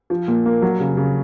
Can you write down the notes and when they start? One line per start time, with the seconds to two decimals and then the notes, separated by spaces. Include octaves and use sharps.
0.10 F3
0.28 A#2
0.46 A#3
0.62 F#3
0.80 C#3
0.97 C#3